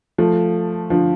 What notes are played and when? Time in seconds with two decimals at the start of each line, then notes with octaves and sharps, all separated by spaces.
0.18 F3 A3
0.90 D3 F3